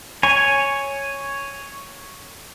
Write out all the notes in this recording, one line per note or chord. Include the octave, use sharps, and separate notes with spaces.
C#5 G#5